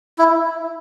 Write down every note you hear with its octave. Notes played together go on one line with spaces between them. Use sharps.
E4